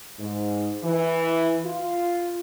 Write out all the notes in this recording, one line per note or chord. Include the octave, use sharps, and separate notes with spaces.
G#2
E3
F4